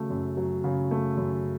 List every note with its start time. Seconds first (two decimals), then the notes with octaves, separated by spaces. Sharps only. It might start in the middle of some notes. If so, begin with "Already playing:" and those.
Already playing: C#3 F#3 A3
0.10 F#2
0.37 F#3
0.64 C#3
0.91 A3
1.17 F#2